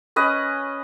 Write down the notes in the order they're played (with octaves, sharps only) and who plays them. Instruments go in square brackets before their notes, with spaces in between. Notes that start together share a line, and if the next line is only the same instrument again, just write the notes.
[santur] C#4 B4 D#5